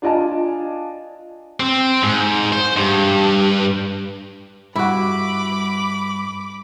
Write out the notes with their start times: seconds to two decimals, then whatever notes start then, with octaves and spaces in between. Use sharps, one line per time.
0.02 D4 F4 D5 D#5 G#5 A5
1.60 C4
2.03 G#2
2.52 C5
2.77 G2
4.76 G2 E4 F#4 B5 D6